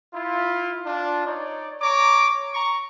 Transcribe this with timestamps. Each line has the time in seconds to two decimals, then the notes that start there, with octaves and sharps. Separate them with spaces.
0.14 E4 F4
0.86 D4 F4
1.25 D#4 C#5 D5
1.82 C#5 A#5 D6
2.54 A#5 C#6